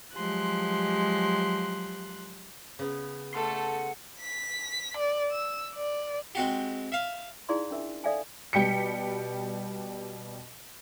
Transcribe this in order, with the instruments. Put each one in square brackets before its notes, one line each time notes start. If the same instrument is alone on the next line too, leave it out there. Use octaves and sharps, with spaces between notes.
[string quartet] F3 F#3 G#3 G4 C6 F#6
[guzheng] C#3 B3
[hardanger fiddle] A3 A4 [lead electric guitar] F#5 C6
[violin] B6
D5
E6
D5
[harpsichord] G#3 C4 F#4 G4
E5 F5
[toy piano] D#4 E4 G#4 D5 F5 C6
C#4 D4 A#4 E5
A4 D5 E5 F5 G5 G#5
[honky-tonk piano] B2 G3 G5 B6 C#7